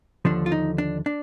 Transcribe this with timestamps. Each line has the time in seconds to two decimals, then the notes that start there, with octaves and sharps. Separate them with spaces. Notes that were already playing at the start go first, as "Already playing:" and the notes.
0.25 D#2 D3 F3 D4
0.46 F4
0.52 D#4
0.78 D4
1.06 D4